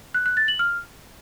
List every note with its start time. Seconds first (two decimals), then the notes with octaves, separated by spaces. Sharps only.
0.14 F#6
0.26 F#6
0.37 A6
0.48 F#7
0.59 F6